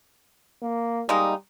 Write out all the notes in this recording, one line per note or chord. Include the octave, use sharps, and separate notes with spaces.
A#3
G3 G#3 A#3 D#4